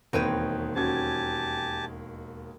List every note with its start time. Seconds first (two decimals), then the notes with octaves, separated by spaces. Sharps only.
0.13 E1 D#2 C4 D#4 B4 C#5
0.75 C#4 F#4 G4 G#5 A5 G#6